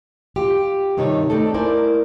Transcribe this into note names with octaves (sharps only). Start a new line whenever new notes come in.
F4 G4
G2 C3 D#3 D#4 C#5 A5
A3 C4 D4 D#4 A4
A#3 E4 A#4 C5 D5 G#5